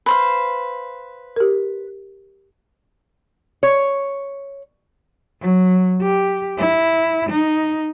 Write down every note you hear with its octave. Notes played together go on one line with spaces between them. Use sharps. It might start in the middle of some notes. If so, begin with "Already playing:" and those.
B4 C5 F5
G4 A#4
C#5
F#3
G4
E4
D#4